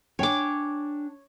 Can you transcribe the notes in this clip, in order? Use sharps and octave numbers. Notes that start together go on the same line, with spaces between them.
D4 C#5 G5 G#5 D6